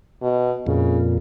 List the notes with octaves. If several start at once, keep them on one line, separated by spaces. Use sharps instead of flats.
B2
F2 A#2 C#3